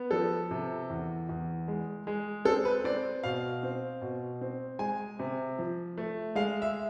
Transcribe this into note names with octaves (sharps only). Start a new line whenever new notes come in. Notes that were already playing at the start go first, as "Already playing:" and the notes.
Already playing: B3
F3 A4
C3
E2
E2
G#3
G#3
C4 A4
B4
C4 D5
B2 F5
C4
B2
C4
G#3 G#5
C3
F3
A3
G#3 F5
E5